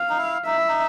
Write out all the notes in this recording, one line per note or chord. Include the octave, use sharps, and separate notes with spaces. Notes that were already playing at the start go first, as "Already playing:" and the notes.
Already playing: F5
D#4
E4
D#4 E5
E4
D#4